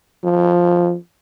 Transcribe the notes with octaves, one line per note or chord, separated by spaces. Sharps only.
F3